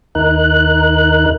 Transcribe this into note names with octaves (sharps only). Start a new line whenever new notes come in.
D#2 D#4 A#4 F#6